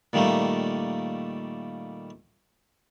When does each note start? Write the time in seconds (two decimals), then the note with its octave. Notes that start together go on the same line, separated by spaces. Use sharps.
0.13 A#2 D#3 G3 A3 A#3